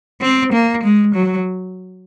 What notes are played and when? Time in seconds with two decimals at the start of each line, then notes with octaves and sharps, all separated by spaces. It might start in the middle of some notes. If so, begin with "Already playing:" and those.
0.21 C4
0.53 A#3
0.83 G#3
1.15 F#3